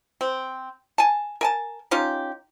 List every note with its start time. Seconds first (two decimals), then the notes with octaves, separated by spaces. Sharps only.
0.21 C4
0.98 G#5 A5
1.41 A#4 G#5 A5
1.91 C#4 D#4 F4 G4